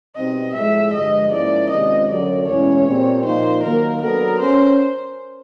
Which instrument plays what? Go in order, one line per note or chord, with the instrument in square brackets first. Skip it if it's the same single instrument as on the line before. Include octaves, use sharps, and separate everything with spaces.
[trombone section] B2 G3 C4 D#4 [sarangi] D#5
[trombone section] A2 F3 G#3 [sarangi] E5
[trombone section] G2 D3 F3 G#3 [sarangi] D#5
[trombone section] G#2 F3 A#3 C#4 E4 [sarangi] D5
[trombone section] C3 D#3 G#3 C#4 F4 [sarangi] D#5
[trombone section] F#2 D3 F#3 A3 [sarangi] D5
[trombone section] E2 B2 G#3 C#4 E4 [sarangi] C#5
[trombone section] A#2 G3 C4
[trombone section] A#2 F3 A#3 D#4 [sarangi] C5
[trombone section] D#3 F#3 A#3 [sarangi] A#4
[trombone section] F#3 B3 D4 F#4 A4 [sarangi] A#4
[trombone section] C#4 [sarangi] C5